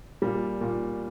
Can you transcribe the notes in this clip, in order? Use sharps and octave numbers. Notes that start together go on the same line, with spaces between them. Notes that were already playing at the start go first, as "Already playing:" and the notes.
A#2 G3
A#2